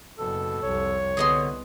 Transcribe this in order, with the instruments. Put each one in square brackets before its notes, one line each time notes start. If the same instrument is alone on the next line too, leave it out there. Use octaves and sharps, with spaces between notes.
[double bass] F#1 [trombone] B2 [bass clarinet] A4
[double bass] C2 F2 [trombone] C#5
[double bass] C2 B3 [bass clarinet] D3 [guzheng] G#4 D#5 C6